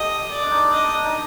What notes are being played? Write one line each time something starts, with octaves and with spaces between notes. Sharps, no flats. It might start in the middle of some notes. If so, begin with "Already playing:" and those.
Already playing: G4 A4 D#5
D5
D4
D#4
D4 D#5
D#4
D4
D#4